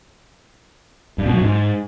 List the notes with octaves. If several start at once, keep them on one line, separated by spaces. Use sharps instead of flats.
G2
B2
F#3
G#2